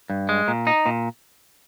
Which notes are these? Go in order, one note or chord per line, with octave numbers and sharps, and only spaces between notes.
G2
G#3
A#2
D#4
A#2